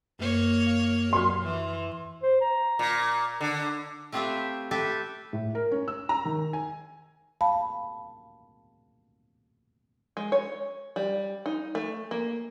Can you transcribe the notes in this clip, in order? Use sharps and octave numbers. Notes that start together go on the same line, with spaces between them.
F#2 A#3 C#5
F5
F#3 C6 F6
E3
C5
A#5
A#2
D3
A3 C4 F4 G4 B4 E5
G4 A4 B4 E5
A2
A#4
C#4
E6
A#5
D#3
G#5
F5 A5 B5
G#3
C#5
G3
D#4
A3
A#3